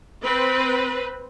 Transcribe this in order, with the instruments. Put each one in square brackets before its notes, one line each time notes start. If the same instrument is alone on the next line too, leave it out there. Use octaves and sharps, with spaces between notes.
[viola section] C4 B4